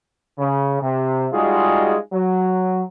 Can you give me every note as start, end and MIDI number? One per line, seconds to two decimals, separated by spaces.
0.39 0.80 49
0.81 1.26 48
1.32 1.96 55
1.32 1.96 56
1.32 1.96 63
1.32 1.96 65
1.32 1.96 66
1.32 1.96 68
2.12 2.82 54